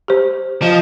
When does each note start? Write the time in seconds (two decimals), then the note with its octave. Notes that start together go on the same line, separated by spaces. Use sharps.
0.08 G4 C5
0.62 F3 D#5